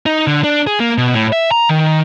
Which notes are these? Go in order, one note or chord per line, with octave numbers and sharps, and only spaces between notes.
D#4
D3
D4
G#4
A#3
B2
A2
E5
A#5
D#3